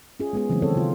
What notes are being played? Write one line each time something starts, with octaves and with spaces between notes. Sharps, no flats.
C#4 F4 G#4
G#3 B3 G#4
C#3 E3 F#3 A3 C4
D#3 C4 A4 C#5
C#3 F4